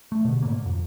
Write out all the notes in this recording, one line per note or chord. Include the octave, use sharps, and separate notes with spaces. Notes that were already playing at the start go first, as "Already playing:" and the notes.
A3
B2 D3
G#2 A#3
F2